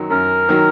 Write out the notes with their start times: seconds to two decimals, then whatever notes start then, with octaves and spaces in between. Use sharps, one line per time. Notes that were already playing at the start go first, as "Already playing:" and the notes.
Already playing: F#2 D#3 F#3
0.10 F#2 A#4
0.49 D#3 F#3